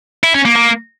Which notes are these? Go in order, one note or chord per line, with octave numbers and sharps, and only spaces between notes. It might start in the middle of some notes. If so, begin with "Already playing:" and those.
E4
C#4
A#3
A#3